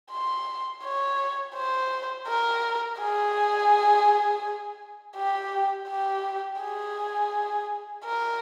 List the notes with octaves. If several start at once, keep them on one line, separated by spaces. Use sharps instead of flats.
C6
C#5
C5
A#4
G#4
G4
G4
G#4
A#4